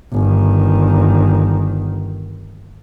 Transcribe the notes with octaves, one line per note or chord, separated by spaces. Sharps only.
G1 D#3